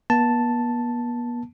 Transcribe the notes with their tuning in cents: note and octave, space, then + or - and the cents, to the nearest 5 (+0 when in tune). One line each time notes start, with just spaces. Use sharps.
B3 -45 A5 +0